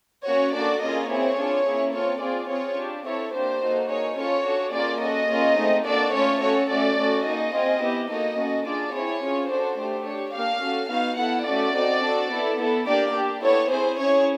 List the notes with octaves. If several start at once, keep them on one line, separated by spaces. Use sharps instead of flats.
A#3 C#4 F#4 C#5
A#3 D4 F#4 A4 D5
A#3 C#4 F4 G#4 D#5
C4 E4 G#4 C#5
D4 F4 G#4
A#3 C#4 E4 G#4
C4 F4 A4 C#5
C4 F4 G#4 D5
C4 F4 G#4 C#5
D4 G4
C4 E4 A4 C#5
A#3 D4 G4 C5
A#3 D#4 F#4 A4
A#3 D#4 G#4 C#5
C#4 F4 A4 C#5
D4 F#4 A4
A#3 C#4 F4 G#4 D5
C#4 F#4 A4 D#5
A#3 C#4 F4 G#4
A3 C4 D#4
A#3 D4 F#4 A4 D5
A3 C#4 F4 C#5
C#4 F#4 A4 C#5
A3 C#4 F#4 D5
A3 C#4 F#4 A4
A#3 D#4 G#4 D#5
C4 F4 G#4
B3 E4 G4
A#3 D#4 F#4 A4 D#5
C#4 F#4 A4
D4 F4 G#4 D5
C4 E4 G#4 C#5
C#4 F4 G#4
D4 F#4 A4 C5
A3 D4 G4
D4 G4 C#5
A#3 D4 G4 F5
C#4 F#4 A4
B3 D#4 F#4 F5
B3 E4 A4 F#5
A3 C#4 F#4 A4 D5
C4 D#4 F#4
D4 F#4 A4
B3 E4 A4
B3 E4 A4
A#3 D4 G4 D5
D4 G4
B3 E4 A4 C#5
C4 E4 G#4 C5
C#4 E4 G#4 C#5